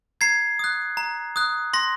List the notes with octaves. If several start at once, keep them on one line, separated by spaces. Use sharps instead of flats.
A#5 G#6 C7
D#6 F#6
A#5
D#6 F#6
C6 A#6